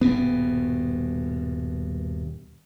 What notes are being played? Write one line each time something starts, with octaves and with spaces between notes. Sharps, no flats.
D#1 G2 B2 B3